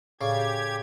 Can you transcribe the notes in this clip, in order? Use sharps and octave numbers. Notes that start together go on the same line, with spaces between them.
A2 C#3 G4 D5 G#6